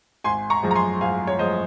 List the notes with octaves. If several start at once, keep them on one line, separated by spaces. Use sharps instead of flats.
G#1 G#5 C6
A#5 C#6
F#2 F3 G#3
A#5
G#5 C6
G#1 F5 G#5
C#5
F#2 F3 G#3 C5 D#5